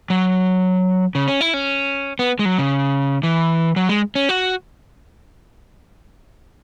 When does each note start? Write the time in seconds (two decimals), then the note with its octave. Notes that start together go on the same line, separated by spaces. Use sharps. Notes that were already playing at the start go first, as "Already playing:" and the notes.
0.10 F#3
1.15 C#3
1.28 C#4
1.41 E4
1.54 C#4
2.19 B3
2.39 G#3
2.45 F#3
2.58 C#3
3.23 E3
3.76 F#3
3.89 G#3
4.15 C#4
4.29 F#4